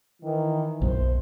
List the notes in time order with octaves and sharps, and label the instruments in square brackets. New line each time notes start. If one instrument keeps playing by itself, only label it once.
[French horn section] D#3 E3
[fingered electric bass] B1 F#2 B2 [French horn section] C5